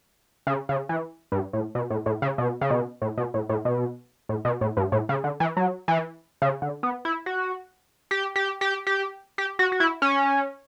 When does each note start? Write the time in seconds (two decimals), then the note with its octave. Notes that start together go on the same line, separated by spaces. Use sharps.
0.47 C#3
0.69 C#3
0.89 E3
1.32 G2
1.53 A2
1.75 B2
1.90 A2
2.06 A2
2.22 C#3
2.38 B2
2.61 C#3
2.70 B2
3.02 A2
3.18 B2
3.34 A2
3.49 A2
3.65 B2
4.29 A2
4.45 B2
4.61 A2
4.77 G2
4.92 A2
5.09 C#3
5.24 D3
5.40 E3
5.57 F#3
5.88 E3
6.42 C#3
6.62 D3
6.83 B3
7.05 E4
7.26 F#4
8.11 G4
8.36 G4
8.61 G4
8.87 G4
9.38 G4
9.59 F#4
9.72 F#4
9.80 E4
10.02 C#4